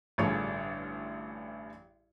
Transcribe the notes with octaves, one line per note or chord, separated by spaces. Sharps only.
A1 G2 D3 F4 G#4 C#5